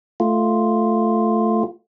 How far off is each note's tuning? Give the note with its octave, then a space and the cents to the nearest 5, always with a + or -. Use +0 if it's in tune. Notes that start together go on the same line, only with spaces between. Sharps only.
A3 +0 F4 +0